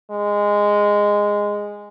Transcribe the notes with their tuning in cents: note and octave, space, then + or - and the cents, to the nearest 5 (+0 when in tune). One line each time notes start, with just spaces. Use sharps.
G#3 -10